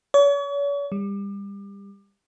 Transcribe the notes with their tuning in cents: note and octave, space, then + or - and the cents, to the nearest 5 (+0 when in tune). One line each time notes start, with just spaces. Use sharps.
C#5 +40
G3 +30